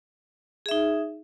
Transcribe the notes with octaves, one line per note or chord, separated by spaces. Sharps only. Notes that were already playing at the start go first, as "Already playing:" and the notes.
D#4 G#4 E5